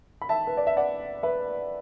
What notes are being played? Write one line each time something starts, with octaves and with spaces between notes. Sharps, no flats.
B5
E5 A5
B4
D5
E5
D5 F#5
B4 E5